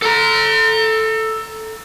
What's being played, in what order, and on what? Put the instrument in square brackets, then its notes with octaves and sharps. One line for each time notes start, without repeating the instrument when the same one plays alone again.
[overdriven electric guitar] A4 A#5